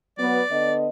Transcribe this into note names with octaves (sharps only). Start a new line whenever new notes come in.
F#3 B3 D5
D3 B3 D#5